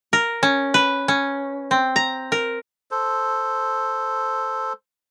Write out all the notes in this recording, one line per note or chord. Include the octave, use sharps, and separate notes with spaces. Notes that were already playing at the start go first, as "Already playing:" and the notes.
A#4
C#4
B4
C#4
C4
A#5
A#4
A4 C5